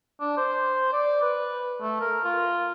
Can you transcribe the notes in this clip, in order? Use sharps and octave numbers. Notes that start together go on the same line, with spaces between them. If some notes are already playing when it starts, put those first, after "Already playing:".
D4
C5
D5
B4
A3
A#4
F4